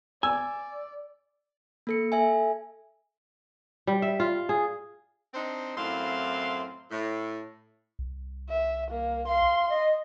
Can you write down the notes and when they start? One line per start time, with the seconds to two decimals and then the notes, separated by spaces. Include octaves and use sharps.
0.23 D5 G#5 E6
1.87 A#3 A4 C#7
2.12 A4 E5 G#5
3.87 G3
4.02 E5
4.20 F4
4.49 G#4
5.34 C4 D4 D#4 C5
5.77 F#2 A2 C4 E4 F5 C6
6.91 A2
7.99 C2
8.49 E5
8.91 A#3
9.28 F5 C6
9.69 D#5